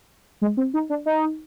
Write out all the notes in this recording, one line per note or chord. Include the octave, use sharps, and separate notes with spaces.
G#3
C4
D#4
D4
D#4